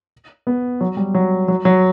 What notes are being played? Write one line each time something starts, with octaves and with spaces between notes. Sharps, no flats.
B3
F#3
G3
F#3
F#3
F#3